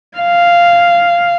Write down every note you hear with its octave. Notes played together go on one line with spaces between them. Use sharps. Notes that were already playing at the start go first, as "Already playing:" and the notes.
F5